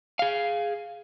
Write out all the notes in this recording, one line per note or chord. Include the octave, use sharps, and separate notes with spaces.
G#4 F5